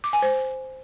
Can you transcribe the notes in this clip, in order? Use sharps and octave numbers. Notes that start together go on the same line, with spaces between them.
D6
G#5
C5